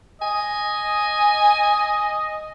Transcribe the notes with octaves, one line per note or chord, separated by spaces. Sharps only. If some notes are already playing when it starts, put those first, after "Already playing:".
D#5 G#5